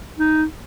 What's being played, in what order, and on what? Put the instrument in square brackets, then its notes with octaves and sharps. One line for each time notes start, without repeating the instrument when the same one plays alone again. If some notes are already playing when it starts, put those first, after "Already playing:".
[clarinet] D#4